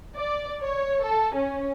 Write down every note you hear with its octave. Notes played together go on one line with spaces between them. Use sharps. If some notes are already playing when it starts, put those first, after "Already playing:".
D5
C#5
A4
C#4